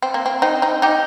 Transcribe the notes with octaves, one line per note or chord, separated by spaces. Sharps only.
C4
A#3
C4
C4 D#4
C4 D#4
D#4 G4